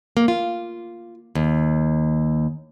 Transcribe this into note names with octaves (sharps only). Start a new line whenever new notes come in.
A#3
F4
D#2